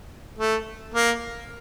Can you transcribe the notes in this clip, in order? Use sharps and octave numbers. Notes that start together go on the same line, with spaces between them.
A3
A#3